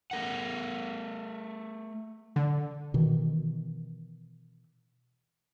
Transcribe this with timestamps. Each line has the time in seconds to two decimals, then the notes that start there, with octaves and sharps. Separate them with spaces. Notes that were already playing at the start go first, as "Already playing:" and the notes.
0.11 A3 A#4 F#5
2.36 D3
2.94 B2 D#3 E3